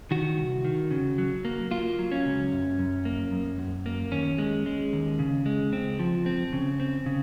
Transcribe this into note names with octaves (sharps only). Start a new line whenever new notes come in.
D#3 F#4
C2
D#3
C#3
F#3
A#3
A#3 F4
F#3
C#4
C#2
F#2
F#2
A#3
F#2
F#2
A#3
D#2 C#4
G#3
G#3
D#2
C#3
G#3
C#2 C4
F3
C4
C#3
C4
C#3